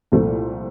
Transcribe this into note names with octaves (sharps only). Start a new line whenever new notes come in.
C2 A#2 F3 A3